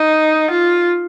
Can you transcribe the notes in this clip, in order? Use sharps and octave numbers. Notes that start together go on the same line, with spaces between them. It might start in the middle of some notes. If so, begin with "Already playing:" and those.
Already playing: D#4
F4